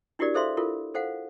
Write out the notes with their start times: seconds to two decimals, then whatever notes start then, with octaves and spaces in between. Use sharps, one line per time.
0.19 D4 E4 F#4 G4 A#4 D5
0.34 G#4 A4 C5 E5 F5 C6
0.57 E4 F4 A4 A#4
0.94 A4 C5 F5 F#5